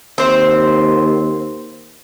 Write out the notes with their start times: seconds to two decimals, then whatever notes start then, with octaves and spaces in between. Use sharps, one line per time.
0.18 D#2 C4 C5